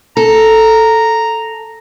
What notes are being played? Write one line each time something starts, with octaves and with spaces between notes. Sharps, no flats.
A4 A#5